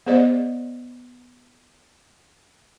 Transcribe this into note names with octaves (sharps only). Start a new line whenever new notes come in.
B3 G#4 C5 D5 D#5